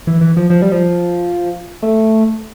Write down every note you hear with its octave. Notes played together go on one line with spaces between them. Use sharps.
E3
E3
F3
F3
G3
F3
A3